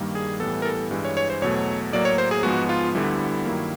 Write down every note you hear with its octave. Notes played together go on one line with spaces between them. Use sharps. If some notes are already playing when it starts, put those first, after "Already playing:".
Already playing: G2 D#3 G3 A#3
G#4
A2 E3 G3 B3 A4
A#4
A4
G2 E3 G#3
C#5
C#5
C5
E2 B2 F#3 A3 C#5
A2 F#3 A#3 D5
C#5
C5
G#4
G#2 F3 G#3 B3 F#4
F4
D2 D3 G3 B3 E4
G2 D#3 F#3 A#3